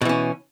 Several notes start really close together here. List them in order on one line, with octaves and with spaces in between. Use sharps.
B2 E3 C#4